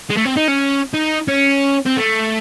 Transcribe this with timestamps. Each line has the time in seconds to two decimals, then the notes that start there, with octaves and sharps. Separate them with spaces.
0.10 G#3
0.17 A3
0.26 C4
0.37 D#4
0.48 C#4
0.94 D#4
1.28 C#4
1.86 C4
1.97 A3